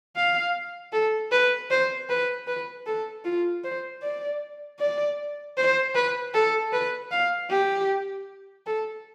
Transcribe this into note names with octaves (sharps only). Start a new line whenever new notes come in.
F5
A4
B4
C5
B4
B4
A4
F4
C5
D5
D5
C5
B4
A4
B4
F5
G4
A4